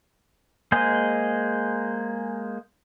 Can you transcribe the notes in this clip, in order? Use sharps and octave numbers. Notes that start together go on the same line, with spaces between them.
G#3 A#3 G#4 C5 D#5